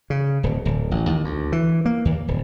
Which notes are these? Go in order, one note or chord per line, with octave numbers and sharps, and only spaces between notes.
C#3
D1
D1
A1
D#2
D2
E3
A#3
D#2
D1